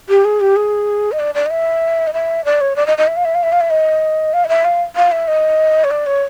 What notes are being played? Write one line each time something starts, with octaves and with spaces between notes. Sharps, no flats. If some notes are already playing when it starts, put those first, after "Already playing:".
G4
G#4
G4
G#4
D#5
D5
D5
D#5
E5
D#5
E5
D5
C#5
D5
D#5
D#5
E5
F5
E5
F5
E5
F5
E5
D#5
F5
D#5
E5
F5
F5
E5
D#5
C#5
D5
C#5